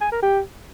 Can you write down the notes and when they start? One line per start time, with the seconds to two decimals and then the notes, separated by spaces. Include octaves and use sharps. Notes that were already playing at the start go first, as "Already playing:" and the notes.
0.01 G#5
0.12 A#4
0.22 G4